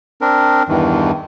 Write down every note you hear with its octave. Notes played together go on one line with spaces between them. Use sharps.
C4 D4 A#4
E2 G2 D#3 E3